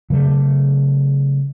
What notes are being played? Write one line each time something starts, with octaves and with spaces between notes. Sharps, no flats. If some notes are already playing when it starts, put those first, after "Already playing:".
C#3 F#3 G3 A3